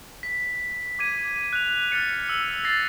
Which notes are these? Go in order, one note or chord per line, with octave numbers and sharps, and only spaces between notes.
B6
D6 G#6 D#7
F#6 F7
F6 F#6 A6 C#7
E6
A6 A#6 C7